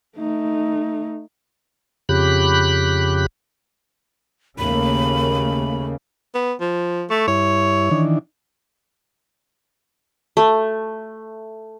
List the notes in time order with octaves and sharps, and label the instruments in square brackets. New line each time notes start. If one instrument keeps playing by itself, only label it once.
[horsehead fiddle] A3 D#4
[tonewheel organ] F2 C#3 G4 B5 F#6
[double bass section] D#2 A3 A#3 [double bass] C#3 [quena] B5
[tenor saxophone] B3
F3
[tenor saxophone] A3 [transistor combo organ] C#6
[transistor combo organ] G2 E4 [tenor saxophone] C#5
[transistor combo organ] D#3 E3 D4
[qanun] A3